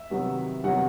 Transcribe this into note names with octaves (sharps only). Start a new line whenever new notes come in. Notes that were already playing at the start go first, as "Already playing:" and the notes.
Already playing: E5
C3 D#3 F#3 B3
C3 D#3 F#3 B3 F#5